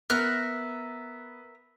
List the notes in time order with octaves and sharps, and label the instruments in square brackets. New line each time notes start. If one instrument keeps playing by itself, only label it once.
[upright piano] B3 [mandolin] A#4 E5 F#5 [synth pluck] F6 F#6